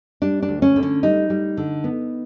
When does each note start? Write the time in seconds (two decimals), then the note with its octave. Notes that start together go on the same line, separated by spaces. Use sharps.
0.22 G3 D4
0.42 D4
0.48 D2
0.62 C#4
0.76 D3
0.83 C#4
1.03 G3 D#4
1.30 G3
1.57 D3
1.84 B3